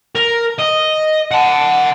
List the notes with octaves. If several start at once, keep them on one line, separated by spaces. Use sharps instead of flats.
A#4
D#5
F#5 A5